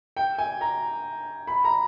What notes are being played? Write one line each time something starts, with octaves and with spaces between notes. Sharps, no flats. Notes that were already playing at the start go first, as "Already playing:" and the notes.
G5
G#5
A#5
B5
A#5